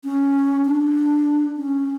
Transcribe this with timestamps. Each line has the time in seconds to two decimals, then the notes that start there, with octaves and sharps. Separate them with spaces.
0.04 C#4
0.65 D4
1.57 C#4